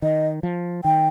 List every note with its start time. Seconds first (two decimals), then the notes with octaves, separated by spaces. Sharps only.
0.02 D#3 D#5
0.43 F3
0.84 D#3 G5